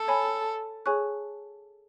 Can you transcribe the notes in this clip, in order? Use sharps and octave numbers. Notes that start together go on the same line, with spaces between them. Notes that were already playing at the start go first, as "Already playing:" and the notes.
Already playing: A4
C#5 G#5 B5
G#4 C#5 G#5 C#6 F#6